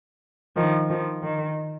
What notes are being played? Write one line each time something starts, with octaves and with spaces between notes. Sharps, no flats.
D#3 F3
D#3 F3
D#3